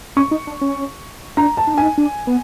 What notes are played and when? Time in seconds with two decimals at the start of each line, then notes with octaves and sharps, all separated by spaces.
0.17 C#4 C#6
0.31 D#4
0.47 D4
0.61 C#4
1.37 D4 A#5
1.57 A5
1.67 D#4
1.74 D4
1.78 D#4 G#5
1.98 D4
2.27 B3